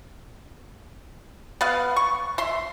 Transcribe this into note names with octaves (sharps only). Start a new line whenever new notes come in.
B3 B4 F5
C#6
E5 C6